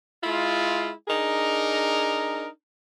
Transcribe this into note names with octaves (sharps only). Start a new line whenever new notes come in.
G#3 E4 F4
D4 D#4 G#4 A#4